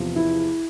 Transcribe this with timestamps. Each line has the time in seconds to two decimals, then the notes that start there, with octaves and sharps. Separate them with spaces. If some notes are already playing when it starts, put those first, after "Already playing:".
Already playing: E2 C3 F3
0.16 E4